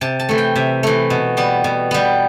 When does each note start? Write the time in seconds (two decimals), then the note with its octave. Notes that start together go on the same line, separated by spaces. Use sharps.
0.01 C3 A5
0.19 A5
0.29 E3 A3
0.38 G5
0.55 C3 E5
0.83 E3 A3
1.10 B2
1.37 G3 B3
1.64 B2
1.91 G3 B3